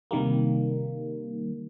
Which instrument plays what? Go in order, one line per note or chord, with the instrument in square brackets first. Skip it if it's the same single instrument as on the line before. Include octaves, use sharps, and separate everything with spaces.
[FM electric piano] C3 D#3 G3 A#3